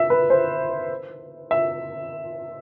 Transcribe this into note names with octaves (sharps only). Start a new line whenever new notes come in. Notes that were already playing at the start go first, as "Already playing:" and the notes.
Already playing: E5
B4
C5
E5